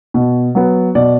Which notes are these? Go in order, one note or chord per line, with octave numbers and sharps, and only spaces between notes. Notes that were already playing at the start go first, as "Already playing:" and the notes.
B2
F#3 B3
B2 D5